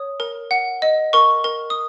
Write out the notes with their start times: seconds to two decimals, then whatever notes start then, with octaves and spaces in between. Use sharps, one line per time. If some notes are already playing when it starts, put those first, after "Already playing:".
Already playing: C#5 D#6
0.20 A#4
0.51 F#5
0.82 D#5
1.13 A#4 C#6
1.44 A#4
1.70 D#6